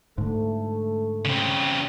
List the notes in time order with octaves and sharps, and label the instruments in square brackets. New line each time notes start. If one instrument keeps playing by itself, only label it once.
[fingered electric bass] G#2 D3 [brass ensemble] A3
[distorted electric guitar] C#3 C4